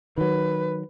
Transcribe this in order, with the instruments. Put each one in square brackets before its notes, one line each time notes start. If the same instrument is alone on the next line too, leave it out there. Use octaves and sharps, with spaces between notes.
[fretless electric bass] D#3 F#3 [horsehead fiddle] B4